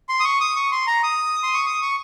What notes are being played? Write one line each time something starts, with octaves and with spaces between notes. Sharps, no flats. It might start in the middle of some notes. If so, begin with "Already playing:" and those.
C6
D#6
C#6
D#6
C#6
C6
A#5
D#6
C6
C#6
D#6
C#6